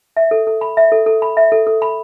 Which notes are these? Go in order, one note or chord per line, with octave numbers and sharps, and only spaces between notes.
E5
A4
A4
B5
E5
A4
A4
B5
E5
A4
A4
B5